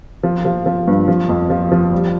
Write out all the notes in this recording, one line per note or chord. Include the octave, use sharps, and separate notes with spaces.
F3
F3
F3
G2
F3
F2
F3
F3
G3